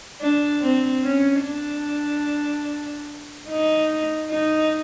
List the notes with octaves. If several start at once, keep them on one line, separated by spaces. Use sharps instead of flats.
D4
C4
C#4
D4
D#4
D#4